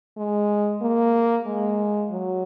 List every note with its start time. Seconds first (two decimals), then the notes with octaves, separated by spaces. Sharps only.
0.17 G#3
0.81 A#3
1.46 G#3
2.11 F#3